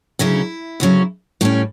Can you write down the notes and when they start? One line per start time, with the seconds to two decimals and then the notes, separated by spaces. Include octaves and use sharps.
0.19 D2 C#3 F#3 C#4 E4
0.80 D2 C#3 F#3 C#4
1.41 A2 G3 C#4 D4